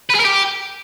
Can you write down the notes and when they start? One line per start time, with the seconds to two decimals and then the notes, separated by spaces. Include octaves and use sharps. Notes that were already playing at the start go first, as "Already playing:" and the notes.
0.10 B4
0.15 G#4
0.20 A#4
0.25 G4